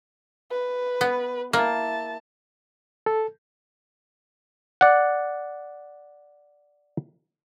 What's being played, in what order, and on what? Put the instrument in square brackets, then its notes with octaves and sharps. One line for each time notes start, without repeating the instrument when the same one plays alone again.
[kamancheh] B4
[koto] B3
[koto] A#3 [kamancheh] E4 A5
[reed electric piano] A4
[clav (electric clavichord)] D5 F#5